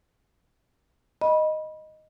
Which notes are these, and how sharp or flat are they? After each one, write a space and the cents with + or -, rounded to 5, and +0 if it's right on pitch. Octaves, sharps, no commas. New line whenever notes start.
D#5 +0 B5 -20